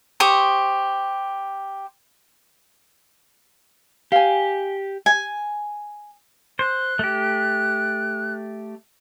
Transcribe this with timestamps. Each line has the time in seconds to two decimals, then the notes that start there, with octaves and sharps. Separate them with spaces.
0.20 G4 C5 C#6 D#6
4.12 G4 F5 G#5
5.06 G#5
6.59 C5 F#6
6.99 A3 G4